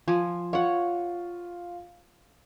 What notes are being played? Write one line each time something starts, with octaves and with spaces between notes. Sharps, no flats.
F3 G#5
F4 C#5 F#5